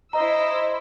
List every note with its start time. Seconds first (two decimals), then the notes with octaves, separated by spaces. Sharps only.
0.13 E4 C5 D#5 A#5 E6